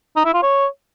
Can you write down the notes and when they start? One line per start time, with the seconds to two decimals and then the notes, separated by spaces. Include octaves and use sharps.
0.16 D#4
0.25 E4
0.34 F4
0.43 C#5